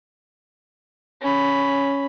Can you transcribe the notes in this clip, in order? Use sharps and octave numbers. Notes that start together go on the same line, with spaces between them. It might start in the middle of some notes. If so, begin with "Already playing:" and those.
C#4 B5